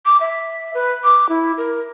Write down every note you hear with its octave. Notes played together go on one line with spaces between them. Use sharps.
D6
E5
B4
D6
E4
A#4